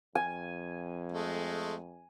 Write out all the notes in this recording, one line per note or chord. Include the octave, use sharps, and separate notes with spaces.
F2 G#5
G#3 A3